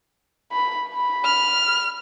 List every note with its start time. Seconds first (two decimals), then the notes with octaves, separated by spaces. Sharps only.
0.52 B5
0.89 B5
1.25 F6